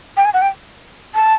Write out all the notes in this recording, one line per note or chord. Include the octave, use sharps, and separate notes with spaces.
G5
G#5
F#5
G5
A5